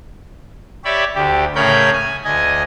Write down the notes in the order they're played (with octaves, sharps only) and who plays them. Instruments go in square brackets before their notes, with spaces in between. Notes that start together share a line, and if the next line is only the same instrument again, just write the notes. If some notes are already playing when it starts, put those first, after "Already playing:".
[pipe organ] G4 C#5 D5 E5 B5
D2 G4
A2 C#3 A#4 C#5 B5 G6
G#5
D2 D#5 G#5